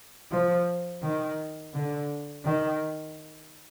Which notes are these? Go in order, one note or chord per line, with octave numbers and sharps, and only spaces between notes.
F3
D#3
D3
D#3